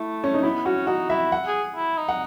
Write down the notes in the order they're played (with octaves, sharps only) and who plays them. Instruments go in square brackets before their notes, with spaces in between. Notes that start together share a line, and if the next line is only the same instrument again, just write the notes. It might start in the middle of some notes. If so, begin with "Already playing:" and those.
Already playing: [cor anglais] A3 [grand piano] E4
[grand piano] C#4
D#4
[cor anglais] B3 [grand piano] E4
[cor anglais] C#4 [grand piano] F#4
[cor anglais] D#4 [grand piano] F#4
[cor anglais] E4 [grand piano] E5
[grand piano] F#5
[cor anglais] G#4
E4
D#4
[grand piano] F#5